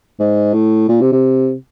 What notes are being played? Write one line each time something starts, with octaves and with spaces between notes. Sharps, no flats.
G#2
A2
A#2
C3
C3